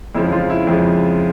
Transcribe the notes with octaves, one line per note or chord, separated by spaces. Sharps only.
F2 C#3 F3 G#3 E4
F3 F4
E4
F2 C#3 F3 G#3 E4